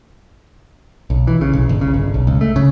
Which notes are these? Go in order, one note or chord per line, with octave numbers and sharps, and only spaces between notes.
B1
E3
C#3
B1
G1
C#3
G1
B1
C#2
A3
C#3